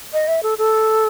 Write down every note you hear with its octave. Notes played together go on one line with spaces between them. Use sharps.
D#5
E5
A4
A4